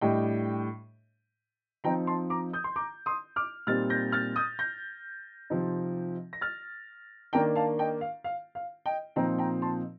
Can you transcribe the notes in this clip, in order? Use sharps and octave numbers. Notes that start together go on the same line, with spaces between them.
A2 G3 D4 D#5 G5
F3 C4 D#4 G5 A#5
A5 C6
A#5 D6
D#6 G6
C6
A#5 D6
C6 D#6
D6 F6
A#2 G3 C4 D#4 F6 A6
G6 A#6
F6 A6
D#6 G6
G6 A#6
C3 F3 C4 D#4
A#6
F6 A6
D#3 A#3 D4 G5 A#5
F5 A5
D#5 G5
F5
F5
F5
D#5 G5
A#2 F3 C4 D#4 G5 A#5
G5 A#5
A5 C6